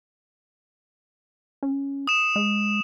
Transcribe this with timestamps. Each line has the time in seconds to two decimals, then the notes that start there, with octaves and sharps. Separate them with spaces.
1.63 C#4
2.07 D#6 E7
2.36 G#3